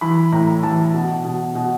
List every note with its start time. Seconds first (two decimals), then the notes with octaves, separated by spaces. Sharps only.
0.01 E3 B5
0.32 A2 A#5
0.63 E3 A5
0.94 B2
1.25 B2
1.55 B2